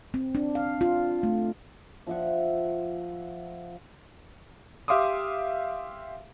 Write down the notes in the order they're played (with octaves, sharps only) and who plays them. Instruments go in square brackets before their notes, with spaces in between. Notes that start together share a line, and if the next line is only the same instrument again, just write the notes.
[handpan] C4
D4
F5
F4
A3
[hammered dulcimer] F3 E5 F#5
[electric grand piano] G4 E5 F5 C6 D6 D#6